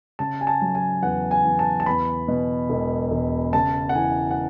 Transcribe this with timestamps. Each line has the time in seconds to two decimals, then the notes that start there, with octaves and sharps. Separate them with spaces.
0.19 C#3 A5
0.41 G#5
0.47 A5
0.61 F#3
0.75 G#5
1.03 E2 F#5
1.31 G#5
1.45 E2
1.59 A5
1.80 A5
1.86 E2 B5
2.28 B2
2.69 E1
3.11 E1
3.53 C#3 A5
3.89 F#5
3.95 E3 G#5
4.31 F#5